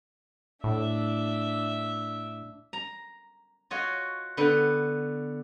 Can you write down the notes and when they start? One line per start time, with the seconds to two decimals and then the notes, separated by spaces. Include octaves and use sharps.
0.64 A2 D4 E5
2.73 A#5
3.71 F4 F#4 C#5 D#5
4.37 D3 B3 B4 G5